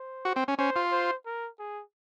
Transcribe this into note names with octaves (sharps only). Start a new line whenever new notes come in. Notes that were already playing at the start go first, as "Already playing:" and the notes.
Already playing: C5
F#4
C4
C#4
C#4 C5
F4
C5
A#4
G#4